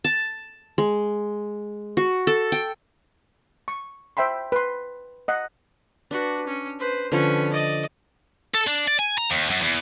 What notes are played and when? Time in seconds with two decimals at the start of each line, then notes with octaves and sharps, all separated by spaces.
0.04 A5
0.78 G#3
1.97 F#4
2.27 A4
2.52 G5
3.68 C#6
4.17 C5 E5 G5 B5 C6
4.52 B4 C6
5.28 D#5 F#5
6.11 D4 F#4 B4
6.47 C#4
6.79 B4 C5
7.12 D3 F3 C#4 B4
7.53 D5 D#5
8.54 A4
8.67 D4
8.88 D5
8.99 G#5
9.18 A#5
9.31 D#2
9.50 F#2
9.62 E2